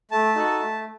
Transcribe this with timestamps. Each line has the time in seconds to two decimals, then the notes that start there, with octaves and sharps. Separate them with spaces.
0.11 A3 A5
0.35 D#4 F#4 A4
0.60 A3